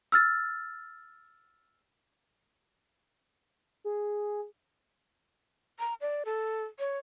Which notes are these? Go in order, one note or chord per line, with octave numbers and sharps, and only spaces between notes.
E6 F6 A6
G#4
A#5
D5
A4
C#5